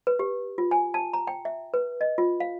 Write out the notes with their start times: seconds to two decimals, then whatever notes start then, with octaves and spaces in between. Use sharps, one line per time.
0.07 B4
0.19 G4
0.58 F4
0.71 G#5
0.94 A5
1.13 A#5
1.27 G5
1.45 E5
1.74 B4
2.01 D#5
2.18 F4
2.40 F5